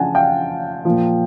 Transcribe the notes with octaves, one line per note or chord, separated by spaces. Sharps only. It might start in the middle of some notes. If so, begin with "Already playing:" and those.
Already playing: C#3 F3 F#5 G#5 A5
F5 G5
A#2 F3